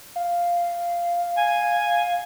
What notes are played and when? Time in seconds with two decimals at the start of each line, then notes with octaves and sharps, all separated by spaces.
0.16 F5
1.37 G#5